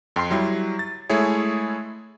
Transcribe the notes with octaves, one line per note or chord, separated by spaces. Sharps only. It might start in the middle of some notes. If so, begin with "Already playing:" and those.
F2 G5 C6 C7
F#3 G3 E4
A6
G#3 A3 E4 G#4 C#5